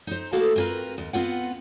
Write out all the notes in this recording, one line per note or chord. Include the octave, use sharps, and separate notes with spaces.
D#4 C5
A3 A#3 E4 F#4 A4 F5
C4 F4 G#4 A#4 B4
D#2
B3 C4 F4 F#5